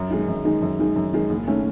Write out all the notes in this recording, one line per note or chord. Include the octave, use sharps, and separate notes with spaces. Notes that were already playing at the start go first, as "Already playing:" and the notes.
Already playing: F#2
D#3 G#3 D#4
F#2
D#3 G#3 D#4
F#2
D#3 G#3 D#4
F#2
D#3 G#3 D#4
F#1
D#3 A3 C#4